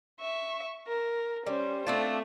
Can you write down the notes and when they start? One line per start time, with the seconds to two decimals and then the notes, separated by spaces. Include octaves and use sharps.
0.20 E5 C#6
0.88 A#4
1.46 G3 C#4 C5
1.87 A3 C4 D4 F4